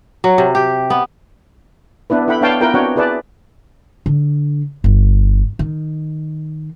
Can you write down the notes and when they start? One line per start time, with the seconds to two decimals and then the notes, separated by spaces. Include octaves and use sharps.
0.24 F#3
0.38 C3
0.55 G4
0.90 B3
2.10 B3 D4 E4 B4
2.28 E4 A4 F#5 G5 B5
2.41 B3 D4 C#5 F5 G5 A5
2.61 B3 E4 F4 A#4 B4 G5
2.74 C4 D4 F#4 C#5 F#5 G5
2.96 E4 G#4 B4 D5 A5
4.06 D3
4.84 G1
5.59 D#3